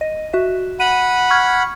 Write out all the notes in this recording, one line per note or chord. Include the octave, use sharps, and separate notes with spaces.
D#5
F#4 E5
F#5 B5 D#7
C#6 F6 G#6